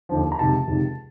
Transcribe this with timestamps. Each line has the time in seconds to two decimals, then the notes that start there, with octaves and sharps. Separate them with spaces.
0.09 D#2 D3 F3
0.32 A#5
0.39 C#2 C3 D#3 A5
0.68 C#2 C3 D#3